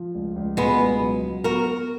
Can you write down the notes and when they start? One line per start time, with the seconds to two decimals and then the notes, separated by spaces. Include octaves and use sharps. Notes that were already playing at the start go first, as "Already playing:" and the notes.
Already playing: F3
0.15 C#2
0.36 C#2
0.57 B2 G#3 B3
0.80 C#2
1.01 F#3
1.23 F#3
1.44 B3 F#4 A#4
1.66 B3